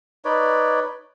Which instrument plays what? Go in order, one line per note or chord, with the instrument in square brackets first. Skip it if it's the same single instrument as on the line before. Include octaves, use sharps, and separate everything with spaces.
[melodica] D#4 B4 C#5 D5